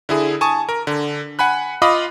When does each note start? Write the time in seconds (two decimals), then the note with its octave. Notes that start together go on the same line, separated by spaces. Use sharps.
0.09 D3 E4 G#4
0.41 G#5 A5 C#6 D#6
0.69 A#4
0.87 D3
1.39 F#5 G#5 B5 F#6
1.82 F4 D#5 F5 B5 D6 D#6